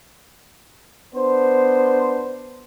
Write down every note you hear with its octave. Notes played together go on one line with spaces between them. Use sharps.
B3 D4 C5